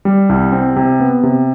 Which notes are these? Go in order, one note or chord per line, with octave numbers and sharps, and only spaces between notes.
G3
C2
C4
C3
B3
C3